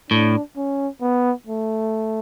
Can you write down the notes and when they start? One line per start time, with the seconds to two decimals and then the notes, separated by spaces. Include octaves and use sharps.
0.10 A2 D4
0.56 C#4
1.01 B3
1.47 A3